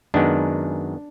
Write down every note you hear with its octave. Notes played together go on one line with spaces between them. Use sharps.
F#2 D#3 G#3 B3 D4